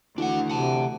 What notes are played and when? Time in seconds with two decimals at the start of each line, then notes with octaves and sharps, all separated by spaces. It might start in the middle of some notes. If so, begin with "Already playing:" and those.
0.18 D2 E3 A3 D4 F#4 F#5
0.50 C3 F#5 A5